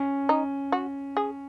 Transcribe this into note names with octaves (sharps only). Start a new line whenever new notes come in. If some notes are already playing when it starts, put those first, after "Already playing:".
Already playing: C#4
D#4
F#4
G#4